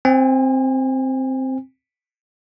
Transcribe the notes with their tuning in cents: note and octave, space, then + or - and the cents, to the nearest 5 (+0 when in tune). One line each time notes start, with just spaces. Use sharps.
C4 +0 G#5 -35